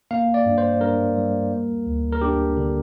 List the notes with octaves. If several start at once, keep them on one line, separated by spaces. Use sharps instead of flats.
A#3 F5
D5
G2
C5
G2 A#4
G3
A#3
D2
A#4
D4 G4
D3